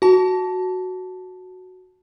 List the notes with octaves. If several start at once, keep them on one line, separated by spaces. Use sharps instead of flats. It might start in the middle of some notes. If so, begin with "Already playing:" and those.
F#4 A5